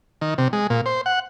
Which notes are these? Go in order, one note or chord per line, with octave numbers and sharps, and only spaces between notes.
D#3
C3
G#3
A#2
C5
F#5